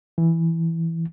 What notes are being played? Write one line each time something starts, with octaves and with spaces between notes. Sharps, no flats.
E3